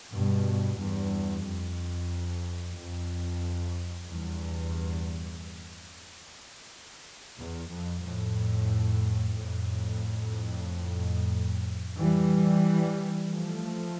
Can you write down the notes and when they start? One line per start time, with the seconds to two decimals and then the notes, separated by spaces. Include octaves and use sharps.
0.12 G2 B2
0.78 E2 G2
1.44 F2
2.76 F2
4.07 E2 G2
7.38 E2
7.70 F2
8.03 F2 A2
9.34 F2 A2
11.98 E3 G3
13.29 F3 A3